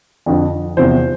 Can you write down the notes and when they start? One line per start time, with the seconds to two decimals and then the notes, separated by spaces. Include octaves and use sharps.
0.26 F2 D3 F3
0.77 E2 C3 F3 C5